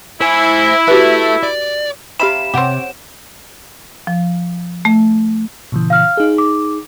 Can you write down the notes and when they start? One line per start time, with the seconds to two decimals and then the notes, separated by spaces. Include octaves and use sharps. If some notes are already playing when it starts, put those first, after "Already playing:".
0.21 E4 C5 G#5
0.88 F#4 G4 A4 B4 E5
1.43 D5
2.20 C3 E4 G4 F5 B5 E7
2.54 C3 C4 G4 C#5 F#5 D7
4.07 F3
4.85 A3
5.72 A#2 C#3 E3
5.90 F5 F6
6.17 D#4 G#4
6.38 D6